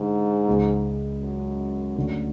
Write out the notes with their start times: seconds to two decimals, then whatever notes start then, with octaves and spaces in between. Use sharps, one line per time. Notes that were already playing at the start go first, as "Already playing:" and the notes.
Already playing: G#2 D3
0.48 C#2 C#3 G#3
1.21 F#2
1.96 D2 D3 A3 C#4 F#4